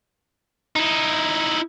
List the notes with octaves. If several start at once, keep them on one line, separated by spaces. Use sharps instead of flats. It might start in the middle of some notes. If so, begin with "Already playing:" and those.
D#4 E4